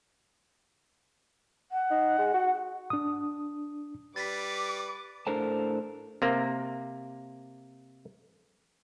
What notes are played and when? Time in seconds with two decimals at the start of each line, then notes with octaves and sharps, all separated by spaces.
1.72 F#5
1.90 D#4
2.18 G#3
2.34 F#4
2.90 D4 D#6
4.16 G3 B4 D6 A6 B6
5.27 A2 D4 A4 A#4 C5 A5
6.22 C3 A#3